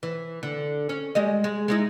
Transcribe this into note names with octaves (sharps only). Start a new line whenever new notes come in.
E3
D3
C#4
G3 G#3 D#5
G#3
G#3 D#4 E4